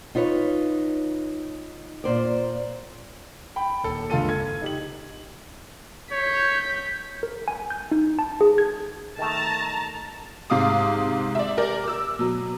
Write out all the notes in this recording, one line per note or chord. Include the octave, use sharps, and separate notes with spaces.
D#4 F4 B4 C#5
A#2 C5 D5
G5 B5
D#1 A4
C#2 G2 F4 A4 D#7
G#6
D#4 G4 F#7
C#5 G6 B6
A#4
G#5
G6
D#4
A5
G#4
G#6
D#3 A3 A5 A#5
G#2 C3 F5 D6 D#6
D5 E5
G4 A#4 D5
D6 E6
B2 F#3